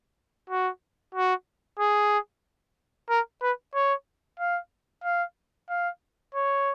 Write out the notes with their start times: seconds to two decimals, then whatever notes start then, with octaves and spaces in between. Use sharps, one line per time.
0.50 F#4
1.14 F#4
1.79 G#4
3.10 A#4
3.42 B4
3.74 C#5
4.40 F5
5.04 F5
5.70 F5
6.35 C#5